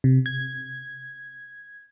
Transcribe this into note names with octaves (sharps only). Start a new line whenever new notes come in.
C3
G#6